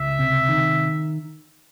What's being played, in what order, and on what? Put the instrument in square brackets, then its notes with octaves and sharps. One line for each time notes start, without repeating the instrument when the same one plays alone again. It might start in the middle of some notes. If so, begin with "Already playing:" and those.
Already playing: [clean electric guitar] C#2 [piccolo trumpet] E5
[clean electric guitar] C3
D#3